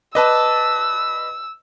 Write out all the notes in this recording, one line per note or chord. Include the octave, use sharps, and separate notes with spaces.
B4 D5 D#5 A5 E6